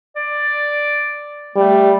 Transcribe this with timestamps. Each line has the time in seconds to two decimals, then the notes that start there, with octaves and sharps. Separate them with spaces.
0.16 D5
1.56 G3 A3